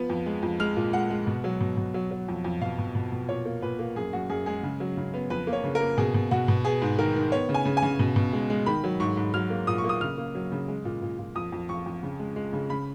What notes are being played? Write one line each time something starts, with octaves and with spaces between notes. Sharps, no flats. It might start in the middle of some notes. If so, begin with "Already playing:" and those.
Already playing: F3 B3
F2
G#3
F2
G#3 F6
A#2
G#3 F#5
G#3
B2
F#3
B2
B2
F#3
F#3
F2
F2
B2 F5
B2
B2
B2
A#2 C#5
A#3
A#2 B4
A#3
F#2 G#4
F#2 F#4
F#2 G#4
G#3 G#4
C#3
F#3
C#3
B3
F2 B4
A#3
C#5
C#3
A#4
A#3
B2 G#4
B2
B2 F#4
B2
B3 G#4
G#2
D#3 A#4
D#3
B3 C#5
C#3
G#5
C#3
G#5
C#3
B2
B2
G#3
G#3
D#3 B5
F#3
G#2 C#6
G#2
F#3 F6
A#3
A#2 D#6
C#6
A#3
D#6
C#3 F6
A#3
F#3
C#3
G#3
A#2
A#2
A#2
F2 D#6
F2
F2 C#6
F2
C#3
G#3
G#3
C#3
C#3 B5